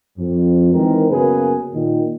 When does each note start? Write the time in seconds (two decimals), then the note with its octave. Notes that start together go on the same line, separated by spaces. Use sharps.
0.18 F2
0.73 D#3 E3 G#3 C4 A#4
1.11 F#2 C#3 A#3 B3 G#4 B4
1.74 A#2 D#3